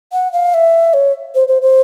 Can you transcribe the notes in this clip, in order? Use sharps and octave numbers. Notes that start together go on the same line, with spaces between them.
F#5
F5
E5
C#5
C5
C5
C5